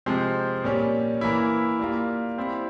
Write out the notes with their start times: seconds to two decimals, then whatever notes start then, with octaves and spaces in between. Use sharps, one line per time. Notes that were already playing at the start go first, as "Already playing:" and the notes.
0.06 C3 F3 G#3 C4
0.64 A#2 G3 C#4
1.21 E3 A#3 E4
1.79 G3 A#3 F4
2.37 G3 C4 E4